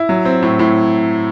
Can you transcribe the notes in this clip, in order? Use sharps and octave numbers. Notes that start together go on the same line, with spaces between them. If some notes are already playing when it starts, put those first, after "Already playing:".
Already playing: E4
F#3
C4
A2
A2